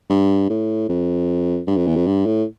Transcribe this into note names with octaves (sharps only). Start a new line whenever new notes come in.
G2
A2
F2
G2
F2
E2
F2
G2
A2